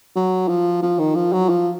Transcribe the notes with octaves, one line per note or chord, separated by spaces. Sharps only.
F#3
F3
F3
D#3
F3
F#3
F3